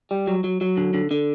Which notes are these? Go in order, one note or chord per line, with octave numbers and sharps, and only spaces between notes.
G3
F#3
F#3
F#3
D3
D3
D3